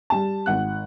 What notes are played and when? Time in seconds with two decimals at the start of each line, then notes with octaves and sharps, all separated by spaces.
0.10 G3 A5
0.46 G#1 F#5 F#6